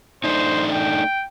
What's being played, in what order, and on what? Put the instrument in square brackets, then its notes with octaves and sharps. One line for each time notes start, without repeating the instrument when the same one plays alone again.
[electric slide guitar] A3 D4 D#4 [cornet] C5
[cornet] G5